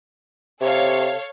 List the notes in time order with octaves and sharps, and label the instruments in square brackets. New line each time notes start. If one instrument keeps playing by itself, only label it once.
[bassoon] C3 [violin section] A4 C#5 F5